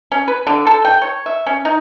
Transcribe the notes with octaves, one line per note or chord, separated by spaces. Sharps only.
C#4
B4
D3
A4
G5
C#5
E5
C#4
D#4